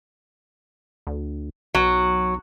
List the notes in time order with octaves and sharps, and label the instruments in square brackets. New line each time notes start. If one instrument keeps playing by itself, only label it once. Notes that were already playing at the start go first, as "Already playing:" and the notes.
[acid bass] D2
[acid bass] B1 [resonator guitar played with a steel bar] F#3